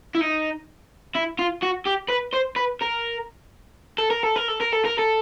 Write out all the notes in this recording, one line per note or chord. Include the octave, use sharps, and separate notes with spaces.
E4
D#4
E4
F4
F#4
G4
B4
C5
B4
A#4
A4
A#4
A4
A#4
A4
A#4
A4
A#4
A4